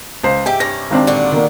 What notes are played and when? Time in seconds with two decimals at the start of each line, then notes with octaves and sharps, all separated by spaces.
0.24 C#2 C5
0.46 G#2 G4 E5 G5
0.60 G2 C3 C#4 A#6
0.91 G#1 C4 D4
1.07 A#2 D3 F#4
1.32 D#3 A#3